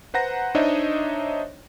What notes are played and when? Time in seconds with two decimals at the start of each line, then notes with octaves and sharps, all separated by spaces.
0.14 B4 C5 F#5 A#5 A#6
0.55 D4 D#4 C5 C#5 D#5 E5